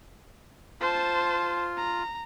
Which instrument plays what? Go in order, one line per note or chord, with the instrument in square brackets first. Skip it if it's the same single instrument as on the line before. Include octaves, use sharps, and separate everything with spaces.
[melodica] F4 [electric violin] C5 A5
[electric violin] A#5